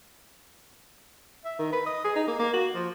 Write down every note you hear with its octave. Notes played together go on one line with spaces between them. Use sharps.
E5
D#3
B4
D#5
G#4
D#4
A#3
A#3
F#4
F3